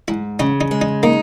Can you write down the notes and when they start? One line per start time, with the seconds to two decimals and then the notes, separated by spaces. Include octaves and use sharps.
0.08 G#2 E4
0.39 C#3 D#4
0.61 D#4
0.71 G#3
0.81 D#4
1.03 A#3 D#4